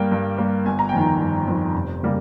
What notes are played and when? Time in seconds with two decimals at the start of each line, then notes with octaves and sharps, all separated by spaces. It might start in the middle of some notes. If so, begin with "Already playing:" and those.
Already playing: G2 G3 A#3 G5
0.12 G2
0.38 G3 A#3
0.66 G1 G#5
0.79 A#5
0.89 G5
0.93 F2 D#3 G#5
1.06 G5
1.20 G1
1.48 F2 D#3
1.75 F1
2.03 C#3 G3 A#3